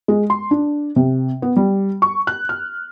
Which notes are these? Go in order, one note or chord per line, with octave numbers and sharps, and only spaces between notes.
G#3
C6
D4
C3
B3
G3
C#6
F#6
F6